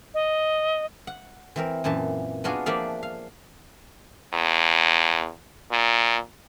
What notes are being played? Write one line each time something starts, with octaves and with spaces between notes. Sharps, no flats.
D#5
F#5
E3 C4 A#4
F#2 A#2 E3 A5
B3 D4 F4 F#4 G#4
F3 A#3 D4 D5 E5 F5
F5
E2
A#2